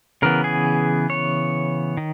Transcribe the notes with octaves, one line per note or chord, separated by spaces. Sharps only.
C#3 E3 B3 A#4
G#4
C#5
D#3